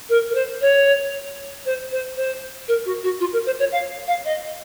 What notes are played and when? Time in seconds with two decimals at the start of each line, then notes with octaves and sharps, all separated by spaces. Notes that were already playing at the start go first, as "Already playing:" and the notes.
0.09 A#4
0.30 A#4
0.35 C5
0.61 C#5
1.66 C5
1.91 C5
2.16 C5
2.68 A#4
2.85 F#4
3.03 F#4
3.20 F4
3.33 A#4
3.46 C5
3.59 C#5
3.72 F5
4.07 F5
4.25 D#5